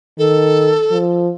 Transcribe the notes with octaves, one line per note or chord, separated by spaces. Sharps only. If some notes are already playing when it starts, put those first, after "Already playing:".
D#3 A4
F3